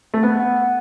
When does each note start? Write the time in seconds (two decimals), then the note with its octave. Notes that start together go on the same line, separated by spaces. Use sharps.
0.14 A3
0.23 B3 F#5
0.40 F#5
0.56 F#5